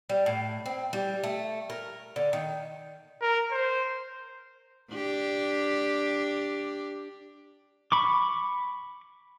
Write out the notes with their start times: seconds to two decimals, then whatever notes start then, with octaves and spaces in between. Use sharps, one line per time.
0.10 G3
0.26 A2
0.66 C4
0.93 G3
1.23 A3
1.70 A#4
2.16 D3
2.33 D#3
3.21 A#4
3.51 C5
4.92 D4 G4
7.92 B5 C#6 D6